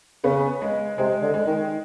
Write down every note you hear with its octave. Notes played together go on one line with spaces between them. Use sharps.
C#3 B3
G#3
C3 G#3
D3
G#3
D#3